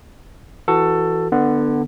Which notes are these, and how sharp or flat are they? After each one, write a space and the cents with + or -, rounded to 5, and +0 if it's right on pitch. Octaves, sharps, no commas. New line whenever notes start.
E3 +0 F#4 +5 A4 +15
D3 +20 B3 +0